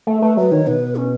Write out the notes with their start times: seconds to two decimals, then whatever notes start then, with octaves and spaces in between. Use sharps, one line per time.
0.07 A3
0.22 A3 B4
0.37 F#3 B4
0.51 D#3 C#5
0.67 B2 B4
0.96 C#4